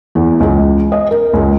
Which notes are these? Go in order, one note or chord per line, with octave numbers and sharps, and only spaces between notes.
E2
C#2
D#5
A#4
C#2